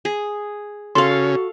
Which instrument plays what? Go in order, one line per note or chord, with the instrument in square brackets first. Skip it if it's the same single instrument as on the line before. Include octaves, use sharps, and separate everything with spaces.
[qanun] G#4
[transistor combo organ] C#3 C#4 [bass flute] F#4 [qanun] A4 F5 [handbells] C6